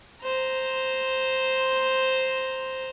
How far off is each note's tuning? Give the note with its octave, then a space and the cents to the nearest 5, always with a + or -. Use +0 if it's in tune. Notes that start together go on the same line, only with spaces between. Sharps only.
C5 +0 A#5 +0